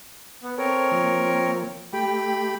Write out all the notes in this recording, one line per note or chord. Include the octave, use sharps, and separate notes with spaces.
B3
C4 A4 A#4 C#5
F3 A#3
A3 G4 G5 B5